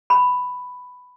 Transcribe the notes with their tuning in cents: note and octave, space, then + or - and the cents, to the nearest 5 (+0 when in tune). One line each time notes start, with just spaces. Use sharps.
B5 +5